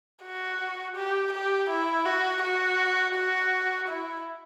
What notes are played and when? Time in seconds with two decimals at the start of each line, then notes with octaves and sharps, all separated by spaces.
0.23 F#4
0.96 G4
1.33 G4
1.70 E4
2.06 F#4
2.42 F#4
3.15 F#4
3.88 E4